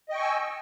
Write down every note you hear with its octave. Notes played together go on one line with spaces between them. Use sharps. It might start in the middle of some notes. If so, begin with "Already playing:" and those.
D#5 G5 G#5 C#6 E6